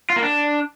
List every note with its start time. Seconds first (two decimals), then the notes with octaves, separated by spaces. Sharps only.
0.10 F4
0.16 A#3
0.23 D4